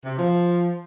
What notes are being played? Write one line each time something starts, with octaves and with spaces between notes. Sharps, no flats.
C3
F3